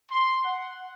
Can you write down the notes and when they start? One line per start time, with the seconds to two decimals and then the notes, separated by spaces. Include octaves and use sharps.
0.10 C6
0.44 F#5